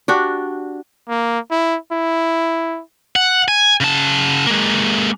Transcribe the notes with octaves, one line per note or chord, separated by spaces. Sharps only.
D4 F#4 G4
A#3
E4
E4
F#5
G#5
C#3 A5
G#3 A#3